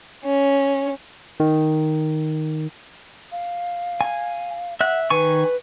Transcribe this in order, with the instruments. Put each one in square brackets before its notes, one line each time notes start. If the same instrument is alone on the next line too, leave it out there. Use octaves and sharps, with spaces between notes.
[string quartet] C#4
[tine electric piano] D#3
[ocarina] F5
[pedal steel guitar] G#5
[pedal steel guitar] E5 F#6 [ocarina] F#5
[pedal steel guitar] D#3 G#5 C#6 [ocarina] B4